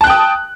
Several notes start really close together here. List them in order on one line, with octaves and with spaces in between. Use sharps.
A5 F#6 G5 D#6